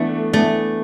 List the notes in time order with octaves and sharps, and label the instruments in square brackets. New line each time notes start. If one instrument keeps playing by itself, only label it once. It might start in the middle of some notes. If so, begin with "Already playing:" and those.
Already playing: [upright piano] E3 B3 D4 [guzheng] A3
[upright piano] E3 B3 D4 [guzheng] A3